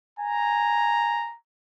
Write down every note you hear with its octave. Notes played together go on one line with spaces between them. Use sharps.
G#5 A#5